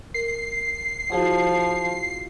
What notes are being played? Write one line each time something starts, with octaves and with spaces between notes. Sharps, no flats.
A#4 C7
F3 E4 F#4 G#4